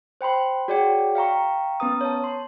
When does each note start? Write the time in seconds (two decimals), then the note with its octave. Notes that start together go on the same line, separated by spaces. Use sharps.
0.21 C5 G5 B5 C6
0.68 F#4 G#4 C#5 D5 F#5 G5
1.15 F5 G5 A#5 C#6
1.80 B3 C#4 B4 A#5 D#6
2.01 C#5 A5
2.24 C6